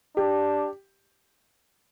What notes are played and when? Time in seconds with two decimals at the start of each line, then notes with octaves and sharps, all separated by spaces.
0.17 D4 G4